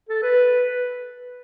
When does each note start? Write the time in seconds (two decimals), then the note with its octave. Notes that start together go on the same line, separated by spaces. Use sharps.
0.09 A4
0.23 B4